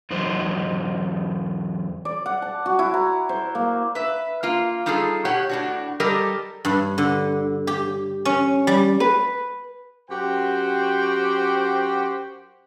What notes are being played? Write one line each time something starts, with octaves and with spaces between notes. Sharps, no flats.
E2 F#3 D#4 C5
D5
F#5
A5
F#4
E4
A#5
C5
A#3
B4 E5
A#3 F4
G3 D#4 F4 G#4 A4
B2 G4 C#5 F#5
A2 D4 F#4
G3 G4 A4 A#4 D#5
G2
D3
G4
C#4
G3
B4
F#2 F#4 G4 C5 G5